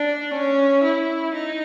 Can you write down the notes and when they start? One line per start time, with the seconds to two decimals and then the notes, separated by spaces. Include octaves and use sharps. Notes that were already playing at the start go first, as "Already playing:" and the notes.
Already playing: D4
0.34 C#4
0.84 E4
1.35 D#4